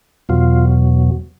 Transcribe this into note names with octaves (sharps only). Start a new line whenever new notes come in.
E2 B2 F#3 F4